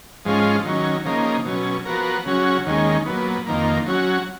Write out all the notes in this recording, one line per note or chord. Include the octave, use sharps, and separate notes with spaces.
G#2 F3 G#3 C#4 F4
D#3 F#3 C#4
C#3 F3 A#3 D#4
B2 F#3 C#4
F3 B3 F#4 A#4
C#3 F#3 C#4 F#4
D#2 D#3 G#3 C#4
A#2 F#3 B3
F2 D#3 A#3
F#3 C#4 F#4